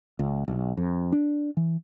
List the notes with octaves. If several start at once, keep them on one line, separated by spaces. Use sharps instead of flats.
C#2
B1
F2
D4
E3